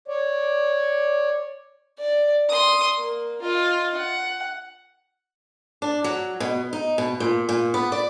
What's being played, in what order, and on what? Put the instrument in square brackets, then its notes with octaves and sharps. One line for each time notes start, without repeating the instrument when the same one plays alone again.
[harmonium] C#5 D5
[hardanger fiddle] D5
C6 D#6
A#3
F4 D#5
F#5
[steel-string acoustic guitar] D4
F#3
B2
D#4
B2
A#2
A#2
B3
D5